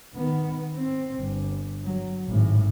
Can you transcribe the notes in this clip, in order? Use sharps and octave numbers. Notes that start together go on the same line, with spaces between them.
D#3 B3
C4
G1
F#3
G#1 A2